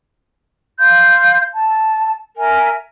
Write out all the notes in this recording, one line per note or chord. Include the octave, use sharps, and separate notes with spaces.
F5 C6 G6
A5
A#4 E5 G#5